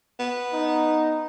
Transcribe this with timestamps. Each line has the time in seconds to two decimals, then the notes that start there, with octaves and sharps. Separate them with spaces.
0.20 B3
0.53 D#4